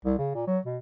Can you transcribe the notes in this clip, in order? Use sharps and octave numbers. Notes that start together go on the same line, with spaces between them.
C2
C#3
A#2
F#3
B2